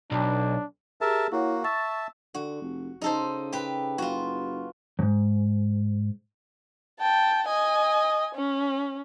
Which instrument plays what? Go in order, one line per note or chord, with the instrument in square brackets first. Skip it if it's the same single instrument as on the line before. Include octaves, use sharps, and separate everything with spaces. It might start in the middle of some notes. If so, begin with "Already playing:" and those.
[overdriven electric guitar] B1 [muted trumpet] D4
[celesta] G4 G#4 [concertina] A#4 E5 A5
[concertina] A#3 F#4 [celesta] E4 C#5 F#5
[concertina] E5 A5 [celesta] C#6 A6
[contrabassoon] D3 [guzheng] F#4
[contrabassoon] F1
[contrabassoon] C#3 [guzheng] D#4 A4 C5
[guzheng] G4 B4
[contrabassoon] F#1 [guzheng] F4 F#4
[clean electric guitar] F2 G#2
[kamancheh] G5 A5
D#5 G#5
C#4